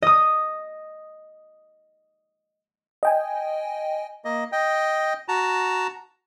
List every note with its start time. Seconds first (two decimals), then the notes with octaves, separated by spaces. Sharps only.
0.02 D#5 D#6
3.03 D#5 G5 G#5
4.25 A#3 D#5
4.52 D#5 G5
5.28 F#4 A5 A#5